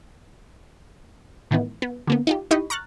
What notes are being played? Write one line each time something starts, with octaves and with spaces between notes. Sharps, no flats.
A2 D#3 E3 B3
B3
D3 A#3 B3
D#4 F4 G4
D#4 E4 G4 D#5 B5 C#6
A#5 C#6 F6 F#6 A6